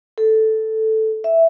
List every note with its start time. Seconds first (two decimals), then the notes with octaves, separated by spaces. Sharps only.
0.18 A4
1.24 E5